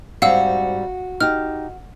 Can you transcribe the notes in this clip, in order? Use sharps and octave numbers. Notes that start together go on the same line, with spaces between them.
G#2 G3 C4 F#4 F5 F#5 E6
D#4 G4 F6